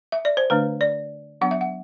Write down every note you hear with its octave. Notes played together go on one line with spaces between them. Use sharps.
E5
D5
C5
D3 A3 D4 B4
D5
F#3 B3 D4 F#5
E5
F#5